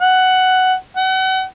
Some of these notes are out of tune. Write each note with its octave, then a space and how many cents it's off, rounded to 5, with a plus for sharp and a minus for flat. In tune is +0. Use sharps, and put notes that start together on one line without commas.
F#5 +10
F#5 +35